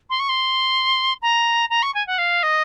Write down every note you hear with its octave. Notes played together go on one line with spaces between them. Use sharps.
C6
C#6
C6
A#5
A#5
C#6
G#5
F#5
F5
D#5